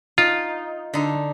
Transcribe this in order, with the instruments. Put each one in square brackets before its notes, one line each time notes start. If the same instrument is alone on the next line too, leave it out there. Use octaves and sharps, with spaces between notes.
[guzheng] D#4 [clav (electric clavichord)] F4
[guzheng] D3 D#4